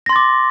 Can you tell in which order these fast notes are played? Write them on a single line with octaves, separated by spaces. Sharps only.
A#6 C6 A6 D6